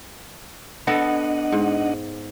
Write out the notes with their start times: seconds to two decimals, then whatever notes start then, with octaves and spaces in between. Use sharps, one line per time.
0.87 B3 D4 A4 D#5 F#5
1.52 G#2